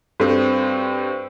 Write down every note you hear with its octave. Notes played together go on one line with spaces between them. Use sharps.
G2 C4 F#4 A4